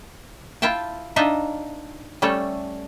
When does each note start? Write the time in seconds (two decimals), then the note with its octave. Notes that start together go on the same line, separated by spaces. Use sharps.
0.62 E4 F4 E5 G5 A5
1.16 D4 D#4 F4 D#5 E5
2.22 G3 A3 C#4 A4